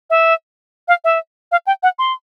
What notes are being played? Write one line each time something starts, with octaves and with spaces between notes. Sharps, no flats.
E5
F5
E5
F5
G5
F#5
C6